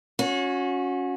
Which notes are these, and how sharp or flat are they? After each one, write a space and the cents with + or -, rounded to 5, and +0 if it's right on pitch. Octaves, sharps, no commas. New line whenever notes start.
C#4 +0 F#4 -30